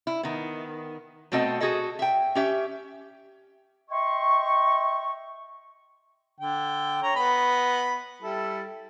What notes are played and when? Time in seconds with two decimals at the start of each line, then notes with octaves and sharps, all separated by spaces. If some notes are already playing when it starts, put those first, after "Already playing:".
0.07 E4
0.23 D#3 B3
1.32 B2 A3 C4 F#4 A4 D#5
1.60 F#4 G#4 A4 D#5
1.99 E5 G5
2.35 C#4 G4 E5
3.90 D#5 E5 G5 C6 C#6
6.40 D3 G5
7.02 C#5 A#5
7.16 B3 D#5 B5
8.22 G3 E4 A4